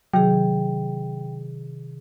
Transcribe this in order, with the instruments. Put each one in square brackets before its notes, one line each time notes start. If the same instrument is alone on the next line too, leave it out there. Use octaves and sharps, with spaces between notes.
[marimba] C3 D#3 G#4 [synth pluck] F#3 [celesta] G5